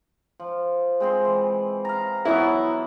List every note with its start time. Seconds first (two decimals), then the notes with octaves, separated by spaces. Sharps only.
0.40 F3
1.00 G#3 C4 C6
1.25 E3
1.85 F5 A#5
2.25 E3 F#3 B3 E4